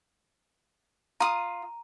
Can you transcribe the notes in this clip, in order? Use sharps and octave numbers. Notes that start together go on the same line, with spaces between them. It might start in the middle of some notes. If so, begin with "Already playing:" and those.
F4 A#5 D#6